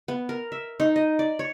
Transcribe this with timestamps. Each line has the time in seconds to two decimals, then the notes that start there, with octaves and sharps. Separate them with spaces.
0.08 B3
0.29 A#4
0.52 E5
0.80 D#4
0.96 D#5
1.19 D5
1.39 C#5